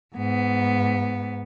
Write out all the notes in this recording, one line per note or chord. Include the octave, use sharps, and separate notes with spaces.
G#2 B3